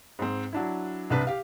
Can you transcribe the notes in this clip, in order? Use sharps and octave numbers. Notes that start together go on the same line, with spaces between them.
G#2 C4
F#3 D4 E4
C2 C3 D4 B4
G4 F5